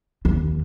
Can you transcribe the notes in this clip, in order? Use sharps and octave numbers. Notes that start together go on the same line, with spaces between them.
D#2